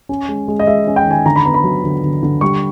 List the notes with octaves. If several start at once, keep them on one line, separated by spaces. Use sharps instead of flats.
C#4
G#3
G#3
D#5
G#3 E5
C#4
G5
D#3
G#5
D3 A#5
B5
B3 A#5
B5
F#3
D3
D3
D3
G3 C#6